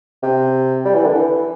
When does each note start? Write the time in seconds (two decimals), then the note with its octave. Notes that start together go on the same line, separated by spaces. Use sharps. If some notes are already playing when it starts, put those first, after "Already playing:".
0.23 C3
0.85 G3
0.95 E3
1.05 D3
1.14 E3